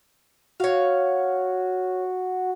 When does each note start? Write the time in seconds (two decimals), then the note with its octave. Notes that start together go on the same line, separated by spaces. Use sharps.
0.60 F#4 C#5 F5